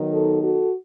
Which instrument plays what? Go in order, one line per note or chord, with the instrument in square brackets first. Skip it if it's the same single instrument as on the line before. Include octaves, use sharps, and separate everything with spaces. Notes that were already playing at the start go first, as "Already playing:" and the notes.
Already playing: [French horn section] D#3 F#3 B3 D#4
F#4 A4
F#4 A4